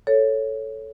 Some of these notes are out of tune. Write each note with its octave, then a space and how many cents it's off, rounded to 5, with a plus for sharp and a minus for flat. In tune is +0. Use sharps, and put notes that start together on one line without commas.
A4 +0 C#5 +0